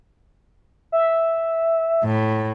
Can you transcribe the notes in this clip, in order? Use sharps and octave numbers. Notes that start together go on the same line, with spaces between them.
E5
A2